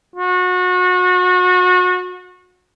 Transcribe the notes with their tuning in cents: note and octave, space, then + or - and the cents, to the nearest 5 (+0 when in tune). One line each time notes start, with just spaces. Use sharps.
F#4 -30